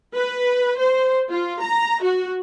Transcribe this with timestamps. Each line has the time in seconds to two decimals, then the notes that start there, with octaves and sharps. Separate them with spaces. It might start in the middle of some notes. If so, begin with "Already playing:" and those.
0.15 B4
0.79 C5
1.31 F4
1.62 A#5
2.03 F#4